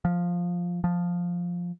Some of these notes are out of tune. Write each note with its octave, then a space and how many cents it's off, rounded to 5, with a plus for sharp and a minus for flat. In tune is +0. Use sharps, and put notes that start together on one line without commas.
F3 +5
F3 +5